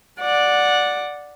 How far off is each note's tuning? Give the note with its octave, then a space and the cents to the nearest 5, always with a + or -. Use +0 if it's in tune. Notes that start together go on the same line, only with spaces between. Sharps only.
D5 +0 F#5 -15